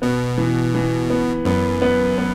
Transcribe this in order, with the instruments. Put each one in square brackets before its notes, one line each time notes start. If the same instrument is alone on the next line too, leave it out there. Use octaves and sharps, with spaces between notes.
[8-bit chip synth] B2 [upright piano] B3
[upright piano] E3
E3
B3
[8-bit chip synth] F#2 [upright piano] B3
[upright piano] B3
B3